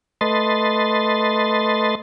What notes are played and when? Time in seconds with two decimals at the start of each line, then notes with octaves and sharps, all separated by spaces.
0.21 A3 B4 D#5 C6 A6